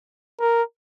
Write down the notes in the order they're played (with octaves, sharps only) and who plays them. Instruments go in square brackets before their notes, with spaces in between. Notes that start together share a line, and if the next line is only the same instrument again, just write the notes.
[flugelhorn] A#4